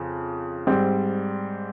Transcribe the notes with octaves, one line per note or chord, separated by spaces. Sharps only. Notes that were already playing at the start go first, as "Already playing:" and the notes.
Already playing: F2 C#3
G#2 G3 C4